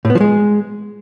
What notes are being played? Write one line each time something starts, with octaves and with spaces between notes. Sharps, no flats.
A2
B3
F3
G#3